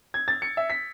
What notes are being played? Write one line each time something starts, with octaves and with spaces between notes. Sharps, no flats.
G#6
A6
C#7
E5
B6